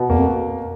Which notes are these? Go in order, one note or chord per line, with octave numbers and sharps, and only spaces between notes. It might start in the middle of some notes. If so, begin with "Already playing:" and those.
Already playing: B2
E2 A#3
F2